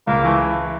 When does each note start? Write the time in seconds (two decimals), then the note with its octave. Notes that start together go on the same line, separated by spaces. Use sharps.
0.07 C#2 A#3
0.24 E3 A3